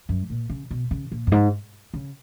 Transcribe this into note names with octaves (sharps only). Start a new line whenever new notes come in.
F#2
A#2
C#3
B2
C#3
A#2
F#2
G#2
C#3